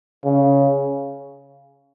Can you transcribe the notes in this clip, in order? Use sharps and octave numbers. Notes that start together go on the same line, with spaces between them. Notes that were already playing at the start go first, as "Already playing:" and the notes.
C#3